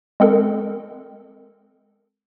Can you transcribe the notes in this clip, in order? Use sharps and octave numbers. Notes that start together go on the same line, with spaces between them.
G#3 C4 A4 A#4